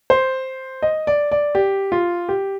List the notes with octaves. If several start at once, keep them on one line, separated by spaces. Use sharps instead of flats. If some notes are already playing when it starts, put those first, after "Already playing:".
C5
D#5
D5
D5
G4
F4
G4